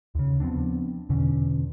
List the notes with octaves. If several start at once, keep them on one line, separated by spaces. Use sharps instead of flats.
D#2 C#3
F3 B3 C4 D4
E2 B2 D3 C#4